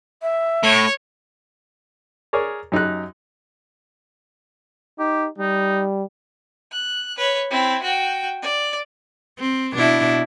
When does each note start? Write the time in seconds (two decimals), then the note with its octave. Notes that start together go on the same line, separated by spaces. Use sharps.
0.22 E5
0.63 A2 C#5
2.33 G#4 A#4 C#5 D5
2.72 F#2 D#4 G4 F#6
4.99 D#4 G4
5.38 G3 D#4
6.72 F#6
7.17 B4 C#5
7.50 C4 E4
7.82 F#4 G5
8.42 D5
9.39 C4
9.74 B2 D4 E4